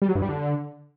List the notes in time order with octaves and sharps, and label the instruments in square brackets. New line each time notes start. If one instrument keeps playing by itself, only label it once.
[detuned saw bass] G3
F#3
G2
G3
D3